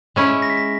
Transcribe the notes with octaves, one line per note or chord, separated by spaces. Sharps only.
G#3 C#4 E4
A#6
B6
A#6